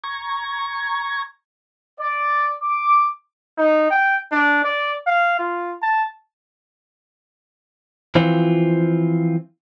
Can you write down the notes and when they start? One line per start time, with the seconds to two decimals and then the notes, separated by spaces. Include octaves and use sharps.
0.04 A#5 C#6 G#6
1.99 D5
2.62 D6
3.58 D#4
3.91 G5
4.32 D4
4.65 D5
5.07 F5
5.39 F4
5.82 A5
8.15 E3 F3 C4 F4